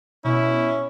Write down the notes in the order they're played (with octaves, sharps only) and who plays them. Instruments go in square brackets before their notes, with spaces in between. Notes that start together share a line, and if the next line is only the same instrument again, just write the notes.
[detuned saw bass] B2 [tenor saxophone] C#4 [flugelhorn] E4